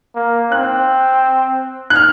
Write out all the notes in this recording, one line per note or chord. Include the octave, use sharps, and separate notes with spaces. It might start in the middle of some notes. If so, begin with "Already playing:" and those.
A#3
C4 F#6
F#6
F6